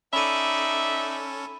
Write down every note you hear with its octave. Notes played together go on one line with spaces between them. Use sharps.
C#4 D#4 A4 D5 E5 B5 D#7